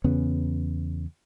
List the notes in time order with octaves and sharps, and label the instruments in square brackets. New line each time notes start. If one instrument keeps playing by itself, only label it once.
[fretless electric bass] E2 C#3 B3 C#4